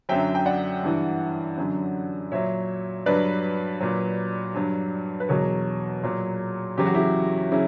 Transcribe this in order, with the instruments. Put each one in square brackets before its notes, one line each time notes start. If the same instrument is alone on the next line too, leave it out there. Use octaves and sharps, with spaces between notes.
[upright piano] F#2 D3 F#3 E5 G5
G5
D5 F#5
G2 E3
F#2 D3 F#3
A#2 F#3 C#5 E5
G2 F#3 B4 D5
A#2 F#3
G2 F#3
B4
E2 B2 F#3 A#4 C#5
A#2 F#3
E2 C#3 F#3 G4
F#4
E4 G4
C#3 F#3 C#4 E4